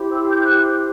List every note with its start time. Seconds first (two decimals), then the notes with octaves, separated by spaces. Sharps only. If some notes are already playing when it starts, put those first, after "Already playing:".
Already playing: E4 G4 C5
0.13 E6
0.31 G6
0.41 F#6